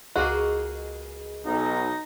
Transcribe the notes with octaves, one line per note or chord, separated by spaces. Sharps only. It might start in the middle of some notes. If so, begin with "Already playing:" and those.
C#2 A#3 F#4 G#4 D#5
B1 D#4